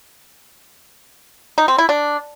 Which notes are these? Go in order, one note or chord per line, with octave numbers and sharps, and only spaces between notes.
D#4
C4
E4
D4